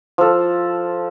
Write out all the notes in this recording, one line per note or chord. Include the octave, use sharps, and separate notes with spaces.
F3 A4